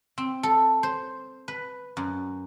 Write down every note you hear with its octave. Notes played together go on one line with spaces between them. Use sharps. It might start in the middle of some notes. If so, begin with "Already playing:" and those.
C4
A4
C5
B4
F#2